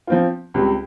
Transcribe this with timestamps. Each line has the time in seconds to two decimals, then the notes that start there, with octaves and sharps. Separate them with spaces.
0.07 F3 C4 F4
0.54 C#2 C3 G3